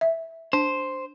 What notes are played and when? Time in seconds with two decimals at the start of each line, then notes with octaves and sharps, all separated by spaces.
0.01 E5
0.53 D4 C5